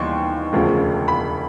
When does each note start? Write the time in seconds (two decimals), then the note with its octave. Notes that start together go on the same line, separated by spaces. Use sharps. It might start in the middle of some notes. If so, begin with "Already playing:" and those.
Already playing: D#2 E3 G3 C6 C#6
0.53 E1 D2 C#3 F3
1.08 B5